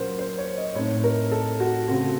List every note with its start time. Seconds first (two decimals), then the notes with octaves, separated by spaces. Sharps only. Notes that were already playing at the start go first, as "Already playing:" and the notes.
Already playing: A#2 F#3 A#3 C#4 A#4 C5
0.19 C5
0.38 C#5
0.57 D#5
0.75 A2 A3 C4 D#4 C#5
1.04 A#4
1.32 A4
1.60 F#4
1.88 C#3 A3 C4 F#4